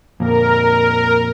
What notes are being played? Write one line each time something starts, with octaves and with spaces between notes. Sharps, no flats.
F2 A#2 A#4